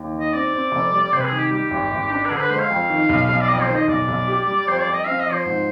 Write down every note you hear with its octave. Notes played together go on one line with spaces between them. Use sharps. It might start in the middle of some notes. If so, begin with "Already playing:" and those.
Already playing: D#2
D#3
D#5
C4 D5
C4
F1
G3
C3 C5
B4
G#4
D#3
G4
G3 G4
G#1
G#1
D4
B4
D3 G#4
C5
B4
G#3 C5
F5
F2
D#3
B1
B1
D5
F2 D#5
C5
D#3
D#5
B1 D5
B1
G4
G3
F2 C5
D5
F2
D#5
C4 F5
D#5
F3
C5
G#2